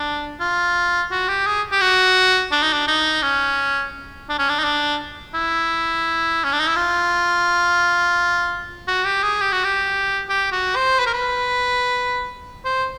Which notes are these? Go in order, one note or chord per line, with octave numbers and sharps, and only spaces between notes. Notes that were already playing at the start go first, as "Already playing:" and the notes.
Already playing: D4
F4
F#4
G4
G#4
G4
F#4
D4
D#4
D4
D#4
C#4
D4
C#4
D4
D#4
D4
E4
C#4
D4
D#4
E4
F4
F#4
G4
G#4
G4
F#4
G4
G4
F#4
C5
B4
A#4
B4
C5